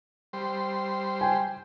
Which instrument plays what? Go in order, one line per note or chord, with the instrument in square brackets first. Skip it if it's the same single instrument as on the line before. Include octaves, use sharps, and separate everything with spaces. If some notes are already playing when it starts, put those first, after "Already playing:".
[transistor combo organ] G3 C5
[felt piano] G5 G#5